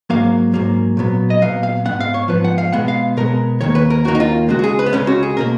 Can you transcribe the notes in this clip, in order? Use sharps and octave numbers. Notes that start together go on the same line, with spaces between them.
G#2 F#3 A#3 F5
G#2 F#3 A#3
A#2 F#3 B3
D#5
A#2 F#3 B3 F5
F5
G#2 F3 B3 F#5
F5
C#5
G#2 F3 B3 B4
F#5
F5
B2 G#3 B3 F#5
F5
B2 G#3 B3 A#4
D#2 D#3 A#3 C#5
B4
A#4
D#2 D#3 A#3 F#4
D#4
F4
C#2 C#3 G#3 F#4
F#4
G#4
B4
B3
C#2 C#3 G#3 C#4
F#4
G#4
B2 A#3 A#4